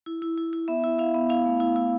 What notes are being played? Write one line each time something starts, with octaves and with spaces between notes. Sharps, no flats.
E4
E4
E4
E4
B3 E5
E4
E4 F5
B3
E4 F5
A3
E4
E4